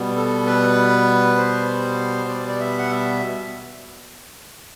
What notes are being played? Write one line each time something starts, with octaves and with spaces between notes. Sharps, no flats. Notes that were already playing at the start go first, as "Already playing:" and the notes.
Already playing: B2 G3 B3
A4
B4
C5
D5
D5
E5
F#5
E5